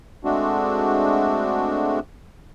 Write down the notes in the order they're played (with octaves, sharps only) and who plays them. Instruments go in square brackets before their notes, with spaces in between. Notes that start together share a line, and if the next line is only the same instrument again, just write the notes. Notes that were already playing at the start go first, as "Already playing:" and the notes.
[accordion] G#3 A3 C4 D4 F#4